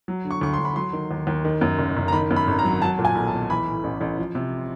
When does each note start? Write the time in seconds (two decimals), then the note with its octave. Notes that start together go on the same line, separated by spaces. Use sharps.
0.08 F#3
0.25 D3
0.31 C#6
0.41 D2 C#6
0.53 C6
0.59 D2
0.65 B5
0.76 F#3 C6
0.93 D#3
1.11 D#2
1.27 D#2
1.45 D#3
1.61 F#2
1.79 F#1
1.97 F#1
2.08 A#5
2.13 D#3 B5
2.31 F#2
2.36 B5
2.48 G#1
2.59 A#5
2.64 F#3
2.82 F#3 A5
2.99 A#2
3.05 G#5
3.15 B1
3.27 A5
3.33 B1
3.50 E3 B5
3.67 A2
3.84 A1
4.01 A1
4.18 F3
4.35 C3